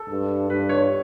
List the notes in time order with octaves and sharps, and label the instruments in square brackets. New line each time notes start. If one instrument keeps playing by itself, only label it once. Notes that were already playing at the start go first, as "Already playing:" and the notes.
Already playing: [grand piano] A4
[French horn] G2
[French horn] G2 [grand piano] B4
[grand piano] C#5